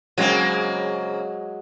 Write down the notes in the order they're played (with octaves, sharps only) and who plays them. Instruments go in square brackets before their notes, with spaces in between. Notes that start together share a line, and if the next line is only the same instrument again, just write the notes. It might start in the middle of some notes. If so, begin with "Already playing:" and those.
[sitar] C#3 A#3 C4 [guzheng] F#3 G#3